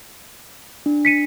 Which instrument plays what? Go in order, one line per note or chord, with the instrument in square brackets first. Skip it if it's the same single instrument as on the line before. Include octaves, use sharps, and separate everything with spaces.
[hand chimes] D4
[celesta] B6 C#7 D#7